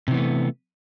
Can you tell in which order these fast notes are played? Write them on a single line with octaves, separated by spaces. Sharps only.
C3 E3 B3 A3